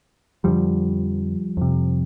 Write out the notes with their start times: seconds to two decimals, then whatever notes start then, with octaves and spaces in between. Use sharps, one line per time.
0.44 F2 D3 F3 G3
1.57 F2 C3